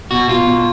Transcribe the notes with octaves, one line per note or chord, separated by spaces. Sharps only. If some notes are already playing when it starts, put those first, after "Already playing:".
B2 F#4
B2 F4
B2